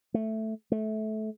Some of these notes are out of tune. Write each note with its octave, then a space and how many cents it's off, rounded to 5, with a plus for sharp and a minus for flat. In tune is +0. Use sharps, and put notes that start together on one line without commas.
A3 +0
A3 -20